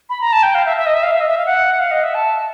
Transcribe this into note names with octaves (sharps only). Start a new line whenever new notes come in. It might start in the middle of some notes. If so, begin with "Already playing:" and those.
B5
A#5
A5
G5
F5
E5
E5
D#5
E5
F5
E5
D#5
E5
F5
F#5
F5
D#5
E5
A5